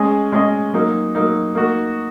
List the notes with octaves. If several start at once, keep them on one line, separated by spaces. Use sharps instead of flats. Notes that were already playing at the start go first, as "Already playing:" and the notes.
Already playing: G#3 C#4 G#4 D#5
G#3 C#4 G#4 D#5
F#3 A#3 D#4
F#3 A#3 D#4
A#3 D#4 F#4